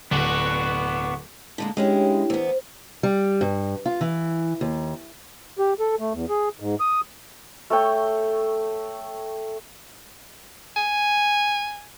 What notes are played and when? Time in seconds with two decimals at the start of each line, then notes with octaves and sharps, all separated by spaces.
0.11 D1 B3 D4 F#4 G7
1.58 D3 G#3 A#3
1.77 G#3 C#4 D4 E4 G4 G5
2.30 E2 B3 C5
3.03 G3
3.41 G2
3.86 F4
4.01 E3
4.61 D#2
5.59 G4
5.80 A4
5.99 A3
6.13 E2
6.29 G#4
6.60 G#2
6.80 D#6
7.70 A3 A4 C#5 G5
10.76 G#5